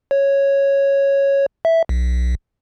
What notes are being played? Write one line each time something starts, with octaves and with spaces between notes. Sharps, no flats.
C#5
E5
B1